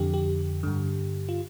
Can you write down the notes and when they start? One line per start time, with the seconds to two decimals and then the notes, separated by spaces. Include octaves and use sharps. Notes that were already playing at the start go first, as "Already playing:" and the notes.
Already playing: F2 D3 G4
0.14 G4
0.63 G2 D3
1.29 F4